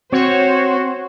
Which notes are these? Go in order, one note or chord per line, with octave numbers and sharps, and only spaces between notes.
C4 F#4 C5 C#5